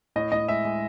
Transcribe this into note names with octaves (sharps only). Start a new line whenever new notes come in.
A2 D#5
A2 D#5
G#3 E5
G#3